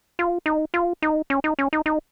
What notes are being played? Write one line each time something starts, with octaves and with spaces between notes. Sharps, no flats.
F4
D#4
F4
D#4
C#4
D#4
C#4
D#4
D#4